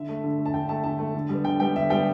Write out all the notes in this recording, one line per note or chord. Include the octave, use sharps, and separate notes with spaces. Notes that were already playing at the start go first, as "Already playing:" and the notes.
Already playing: D3 E5
A3
D3
A3
A5
D3 G5
A3 A5
D3 A5
A3
D3
G3 B3
D3 G5
G3 B3 G5
D3 E5
G3 B3 G5